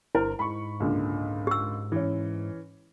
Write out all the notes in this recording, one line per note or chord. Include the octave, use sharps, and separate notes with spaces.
G1 E4 A#4 C5
G#2 B5 C#6
C#2 A#2 D3
G4 E6
E3 C#4